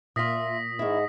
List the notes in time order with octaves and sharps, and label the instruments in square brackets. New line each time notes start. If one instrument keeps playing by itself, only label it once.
[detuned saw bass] A#2 [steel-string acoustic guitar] F4 E5 [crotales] D#6 A#6 B6
[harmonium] G#2 [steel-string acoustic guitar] D#3 E4